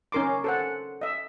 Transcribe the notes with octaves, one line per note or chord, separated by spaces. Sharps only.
C#4 D#4 A#4 C6 D6
A4 C5 F#5
D#5 E5